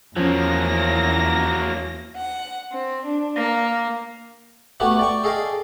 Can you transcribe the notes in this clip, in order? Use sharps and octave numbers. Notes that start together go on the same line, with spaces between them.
E2 F3 F#3 A#3 C#4 A#6
F#5
C4
D4
A#3
A3 B3 E4 F#4 G4
D5 G5 C#6
G#4 A4 D#5 F5 G5